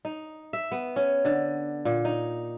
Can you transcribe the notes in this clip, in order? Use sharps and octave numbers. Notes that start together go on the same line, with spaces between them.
D#4
E5
B3
C#4
D3
A#2
D#4